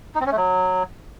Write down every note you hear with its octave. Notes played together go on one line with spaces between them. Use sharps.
D#4
C4
C#4
A3
F#3